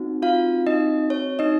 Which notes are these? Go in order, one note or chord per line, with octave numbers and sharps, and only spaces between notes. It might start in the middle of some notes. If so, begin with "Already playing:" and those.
Already playing: C4 D#4 F#4
F4 F5
D#4 D#5
C#5
D#4 D#5